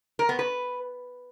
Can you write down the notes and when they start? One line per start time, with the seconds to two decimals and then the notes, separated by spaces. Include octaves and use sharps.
0.19 A#4
0.29 B3
0.39 B4